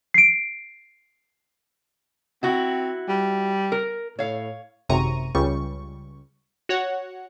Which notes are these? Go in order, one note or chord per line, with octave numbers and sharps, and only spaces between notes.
C7 D7
C4 E4 F#4
G3
A#4
A2 C#5 F5
G#1 F#2 C3 A#5 C#6 D#7
C#2 C#3 G3 C#6
F#4 C#5 F#5